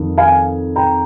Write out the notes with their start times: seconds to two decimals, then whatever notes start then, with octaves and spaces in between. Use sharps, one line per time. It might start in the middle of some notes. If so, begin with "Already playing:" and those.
Already playing: F2 D#3
0.18 F5 G#5
0.76 G5 A#5